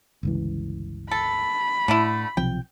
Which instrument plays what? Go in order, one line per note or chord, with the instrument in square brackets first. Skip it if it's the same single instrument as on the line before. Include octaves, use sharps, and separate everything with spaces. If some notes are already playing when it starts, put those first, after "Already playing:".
[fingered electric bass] G1 C#2 E3
[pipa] A4 [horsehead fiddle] B5
[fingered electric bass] A2 [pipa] D3 A3 E4
[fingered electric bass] B1 C3 F3 [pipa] G5